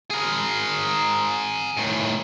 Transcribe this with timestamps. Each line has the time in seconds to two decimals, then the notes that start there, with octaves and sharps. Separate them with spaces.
0.11 G#4 A#4
1.77 A2 D#3